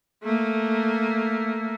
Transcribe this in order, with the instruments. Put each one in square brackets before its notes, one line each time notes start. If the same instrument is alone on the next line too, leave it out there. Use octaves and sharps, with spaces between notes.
[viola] A3 A#3